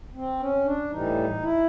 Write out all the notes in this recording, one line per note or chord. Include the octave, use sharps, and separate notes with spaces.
C4
C#4
D4
A2 E3 G3 D#4
E4